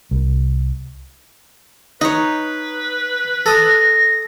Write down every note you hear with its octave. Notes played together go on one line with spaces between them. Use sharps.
C2
D#4 B4 C#5 D#5
A4 D#6 A#6